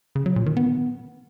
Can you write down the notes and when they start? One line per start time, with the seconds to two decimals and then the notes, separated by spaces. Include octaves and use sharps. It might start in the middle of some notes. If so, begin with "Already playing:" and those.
0.15 C#3
0.26 F#3
0.36 A#2
0.46 D#3
0.57 B3